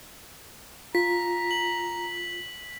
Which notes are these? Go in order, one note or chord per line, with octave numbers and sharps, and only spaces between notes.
F4 A#5 B6
F#7